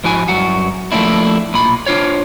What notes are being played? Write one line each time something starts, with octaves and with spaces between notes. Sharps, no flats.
G#2 F3 E4 F#4 G#5
G2 F#3 F#4
F3 A3 A#3 D4 E4
B1 A#2 B5
D4 F4 C5 C#5